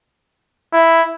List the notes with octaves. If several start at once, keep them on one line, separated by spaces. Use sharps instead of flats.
E4